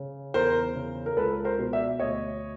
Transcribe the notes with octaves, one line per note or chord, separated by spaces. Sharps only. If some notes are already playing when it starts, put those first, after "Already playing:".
Already playing: C#3
E2 A#4 C5
C#3
A#4
C#2 A4 B4
A#4 C5
B2
D5 E5
D2 C#5 D#5